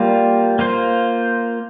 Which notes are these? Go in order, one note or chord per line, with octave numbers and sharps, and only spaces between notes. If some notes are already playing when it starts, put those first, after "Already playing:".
Already playing: G3 A#3 F4
A#3 F4 C5